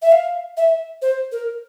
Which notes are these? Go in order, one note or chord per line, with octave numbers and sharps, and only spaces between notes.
E5
F5
E5
C5
A#4